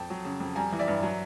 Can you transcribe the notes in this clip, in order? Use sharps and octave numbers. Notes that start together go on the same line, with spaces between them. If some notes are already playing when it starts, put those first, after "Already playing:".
Already playing: F2 G5 A5
F#3
C#3
F2
G3 G#5 A#5
E3
D5 E5
G2
F#3